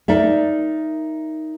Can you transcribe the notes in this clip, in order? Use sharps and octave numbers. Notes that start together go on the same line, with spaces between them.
D#4 A#4 D5 E5